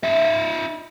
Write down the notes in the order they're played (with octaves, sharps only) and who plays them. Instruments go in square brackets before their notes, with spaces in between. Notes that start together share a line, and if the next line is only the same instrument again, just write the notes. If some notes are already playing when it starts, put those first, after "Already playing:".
[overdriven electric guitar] D#4 E5